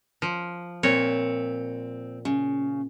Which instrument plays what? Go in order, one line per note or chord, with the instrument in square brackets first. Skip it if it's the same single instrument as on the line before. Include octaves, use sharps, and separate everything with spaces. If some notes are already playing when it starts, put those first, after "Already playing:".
[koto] F3
[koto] A#2 C#5 [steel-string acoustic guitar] C4
[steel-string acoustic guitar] C#3